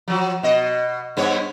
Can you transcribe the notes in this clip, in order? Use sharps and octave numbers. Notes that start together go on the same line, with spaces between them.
F3 F#3
B2 D#5
G2 B3 C#5